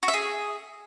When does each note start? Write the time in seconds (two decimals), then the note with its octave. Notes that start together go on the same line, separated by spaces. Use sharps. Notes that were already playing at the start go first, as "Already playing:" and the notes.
0.03 F#4
0.08 E5
0.14 G#4